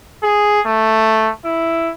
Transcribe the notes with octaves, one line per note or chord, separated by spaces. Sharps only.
G#4
A3
E4